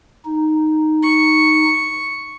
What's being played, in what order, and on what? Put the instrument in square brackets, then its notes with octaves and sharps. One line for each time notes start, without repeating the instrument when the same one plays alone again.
[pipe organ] D#4
[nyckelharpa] C#6